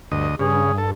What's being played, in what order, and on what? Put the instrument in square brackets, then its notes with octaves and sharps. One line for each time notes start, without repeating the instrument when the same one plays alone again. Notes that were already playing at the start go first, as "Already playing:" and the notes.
[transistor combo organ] D2 D#5 [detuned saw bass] G2
[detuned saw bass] G2 [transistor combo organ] C#3 [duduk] G#4
[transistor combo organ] A4